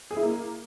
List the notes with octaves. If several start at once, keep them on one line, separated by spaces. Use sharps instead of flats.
G#4
E4
A#3